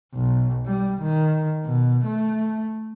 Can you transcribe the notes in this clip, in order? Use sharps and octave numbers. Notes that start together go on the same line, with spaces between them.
B1
G3
D#3
B2
A3